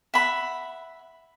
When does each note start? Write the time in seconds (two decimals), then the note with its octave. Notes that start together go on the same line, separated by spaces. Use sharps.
0.14 E5 F#5 B5